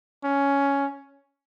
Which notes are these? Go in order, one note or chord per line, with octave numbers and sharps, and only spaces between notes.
C#4